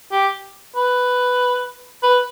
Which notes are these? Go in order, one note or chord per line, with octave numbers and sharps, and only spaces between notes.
G4
B4
B4